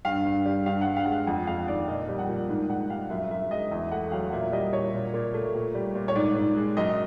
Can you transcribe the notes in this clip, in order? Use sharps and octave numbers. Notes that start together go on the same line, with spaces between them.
G2 F5
G2
G3
G2 F5
F#5
G2
F5
G#3 F#5
F5
F2 F#5
F2 F5
D#3 D5
A#2 D#5
G3
F#5
A#2
G#2
G#2 F#5
G3 F5
F#2 E5
F#2 E5
G#3 D#5
E2 E5
A3 F#5
F#3 F5
A#2 E5
G3 D#5
A#2 C#5
A#2
A#2
A3
A#2
G3
A#2
C#5
G#2 D5
G#2
G#3
F#2 D#5